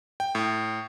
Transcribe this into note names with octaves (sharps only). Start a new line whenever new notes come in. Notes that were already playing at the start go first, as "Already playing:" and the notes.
G5
A2